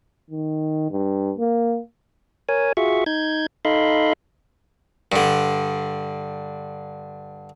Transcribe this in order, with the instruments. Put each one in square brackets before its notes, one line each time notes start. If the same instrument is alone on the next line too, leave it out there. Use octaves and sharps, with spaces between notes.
[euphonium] D#3
G2
A#3
[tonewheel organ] A#4 C#5 G#5
F4 F#4 G#4 E5 C#6
D#4 G6 G#6
D#4 A4 D#5 F5 B5 C6
[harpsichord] G2 D3